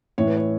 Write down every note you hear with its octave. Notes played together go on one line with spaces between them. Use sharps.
A2 E3 C#5
B4
C#5